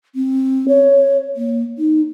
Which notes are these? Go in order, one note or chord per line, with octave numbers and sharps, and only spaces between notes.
C4
C#5
A#3
D#4